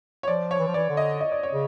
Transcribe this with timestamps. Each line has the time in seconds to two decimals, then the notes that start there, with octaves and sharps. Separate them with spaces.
0.23 C#5
0.27 F3 D5
0.51 C#5
0.59 E3
0.67 F3
0.74 E3 D5
0.89 D3
0.97 D#5
1.21 D#5
1.32 D5
1.43 C#5
1.52 C#3